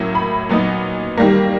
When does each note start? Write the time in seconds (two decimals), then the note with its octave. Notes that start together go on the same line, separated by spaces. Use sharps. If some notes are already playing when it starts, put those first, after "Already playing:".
Already playing: A2 F#3 A#3 C#4 E4
0.15 B5
0.49 A#2 F#3 B3 D#4
1.18 D#3 G3 A#3